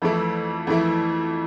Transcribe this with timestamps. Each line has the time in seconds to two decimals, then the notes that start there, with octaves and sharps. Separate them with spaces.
0.02 F2 E3 A3 E4
0.67 F2 E3 A3 E4